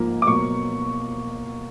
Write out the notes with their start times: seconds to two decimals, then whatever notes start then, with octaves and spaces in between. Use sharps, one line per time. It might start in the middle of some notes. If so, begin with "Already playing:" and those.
Already playing: G#2 F3 A#3
0.22 D6
0.27 B2 F#3 A#3 C#6